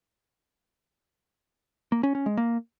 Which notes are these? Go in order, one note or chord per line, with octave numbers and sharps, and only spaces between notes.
A#3
C#4
C#4
G#3
A#3